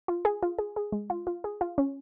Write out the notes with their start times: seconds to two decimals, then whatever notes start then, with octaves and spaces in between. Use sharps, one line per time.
0.08 F4
0.25 G#4
0.43 F4
0.59 G#4
0.76 G#4
0.92 G#3
1.10 F4
1.27 F4
1.44 G#4
1.61 F4
1.78 C#4